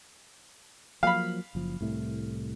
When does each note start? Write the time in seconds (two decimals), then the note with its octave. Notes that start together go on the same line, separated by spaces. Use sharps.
1.03 F3 F#3 A#3 F5 B5
1.55 F#1 F3
1.81 C2 A2 A3